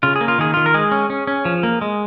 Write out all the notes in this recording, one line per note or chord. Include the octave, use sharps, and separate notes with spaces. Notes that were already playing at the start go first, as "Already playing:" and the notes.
C#3 F4
G#4
A#3
F4
D#3 G#4
D#3 F4
A#4
G#3 G#4
C#4
C#4
C#4
F3
A#3
G#3